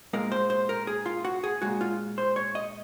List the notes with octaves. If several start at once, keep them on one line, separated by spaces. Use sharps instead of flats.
A#2 G#3 A#4
C5
C5
A#4
G#4
F4
F#4
G#4
A#2 G#3 F#4
F4
C5
C#5
D#5